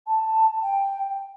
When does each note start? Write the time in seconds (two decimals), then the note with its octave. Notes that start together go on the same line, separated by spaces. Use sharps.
0.06 A5
0.62 G5